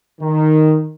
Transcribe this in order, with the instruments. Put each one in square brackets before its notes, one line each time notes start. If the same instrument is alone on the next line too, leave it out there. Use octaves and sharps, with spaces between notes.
[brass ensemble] D#3